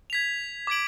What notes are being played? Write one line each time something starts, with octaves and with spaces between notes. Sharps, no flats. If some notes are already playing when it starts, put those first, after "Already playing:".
G#6 B6 F7
D6 G#6 D7 F#7